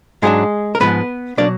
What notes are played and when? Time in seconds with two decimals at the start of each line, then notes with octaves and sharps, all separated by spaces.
0.22 G#2 F#3 G#3 B3 D4 G#4
0.75 A#4
0.80 G#2 F3 G#3 B3 B4
1.37 B2 F#3 A#3 D4 D5